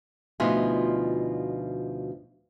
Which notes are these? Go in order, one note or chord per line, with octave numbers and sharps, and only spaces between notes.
D2 B2 F3 D#4 F4 G#4